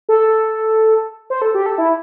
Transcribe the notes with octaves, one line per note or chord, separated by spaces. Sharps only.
A4
C5
A4
G4
A4
E4